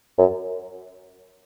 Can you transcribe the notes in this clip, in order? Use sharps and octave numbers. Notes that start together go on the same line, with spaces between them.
F#2